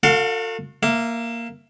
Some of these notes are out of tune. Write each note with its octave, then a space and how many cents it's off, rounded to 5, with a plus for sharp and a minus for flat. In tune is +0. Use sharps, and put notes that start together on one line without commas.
F#4 -30 A4 +40 F5 +5
A#3 +0 E5 +20